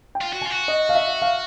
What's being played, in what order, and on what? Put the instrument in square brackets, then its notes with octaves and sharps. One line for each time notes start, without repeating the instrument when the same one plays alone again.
[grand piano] G5
[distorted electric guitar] F4
F#4
[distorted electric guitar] F4 [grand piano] G#5
[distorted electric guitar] F#4
[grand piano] D#5
F5
E5
F5